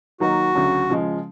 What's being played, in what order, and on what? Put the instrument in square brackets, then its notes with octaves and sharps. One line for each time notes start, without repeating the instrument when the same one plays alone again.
[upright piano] D#3 F#3 A#3 D#4 [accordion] F#4
[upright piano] D2 C#3 F#3
C#3 F3 G#3